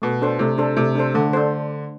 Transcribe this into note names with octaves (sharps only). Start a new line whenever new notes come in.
B2 A3
D4 A4 C5
C3 A3
D4 A4 C5
C3 A3
D4 A4 C5
D3 A3
D4 A4 C5